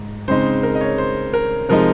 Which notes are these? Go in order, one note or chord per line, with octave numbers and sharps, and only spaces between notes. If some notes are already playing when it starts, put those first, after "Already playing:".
Already playing: G#2
C#3 G#3 C4 D#4 C5
A#4
D#5
C#5
C5
A#4
C3 F3 G#3 D#4 A#4